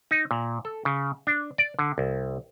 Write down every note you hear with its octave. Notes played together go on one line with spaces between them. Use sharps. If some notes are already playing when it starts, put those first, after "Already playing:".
D#4
A#2
A4
C#3
D4
D5
D3
C2